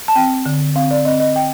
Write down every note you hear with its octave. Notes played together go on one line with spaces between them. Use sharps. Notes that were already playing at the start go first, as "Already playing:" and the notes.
A5
C4 G5
D3
C4 F5
D5
C4 D#5
D#5
G5